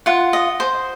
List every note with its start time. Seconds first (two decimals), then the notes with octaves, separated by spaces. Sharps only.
0.06 F4 F#5
0.33 D#5
0.60 C5